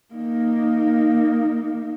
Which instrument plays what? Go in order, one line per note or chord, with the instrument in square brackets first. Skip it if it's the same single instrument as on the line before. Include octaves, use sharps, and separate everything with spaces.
[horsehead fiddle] A#3 D#4